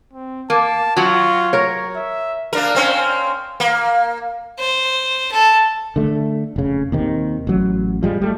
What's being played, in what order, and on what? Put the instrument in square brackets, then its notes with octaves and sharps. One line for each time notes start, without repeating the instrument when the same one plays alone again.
[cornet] C4
[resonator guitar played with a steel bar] A#3 [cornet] A5
[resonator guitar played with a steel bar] F#3 F#4 [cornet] F4
[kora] A#4 C#5
[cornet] E5
[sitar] A#3 D4 A#4
A#3 C4 C#4
A#3
[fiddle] C5
A4
[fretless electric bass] D3 A3
F1 C#3
D#2 C3 D#3
A1 F#3
F3 G3 G#3
G3 A3